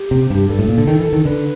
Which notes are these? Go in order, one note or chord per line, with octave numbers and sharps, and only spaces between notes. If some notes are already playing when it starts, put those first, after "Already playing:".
Already playing: G4
C3
G2
G2 A4
A2
A#2
D3
D#3
E3
D#3
D3 B4